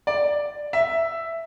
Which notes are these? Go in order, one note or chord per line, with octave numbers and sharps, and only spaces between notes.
D5
E5